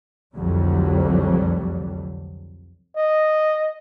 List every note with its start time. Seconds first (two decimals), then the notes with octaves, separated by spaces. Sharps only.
0.35 F1 C2 F2 D3 F#3 G3
2.97 D#5